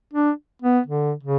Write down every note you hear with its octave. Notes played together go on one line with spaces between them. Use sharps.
D4
B3
D3
C#3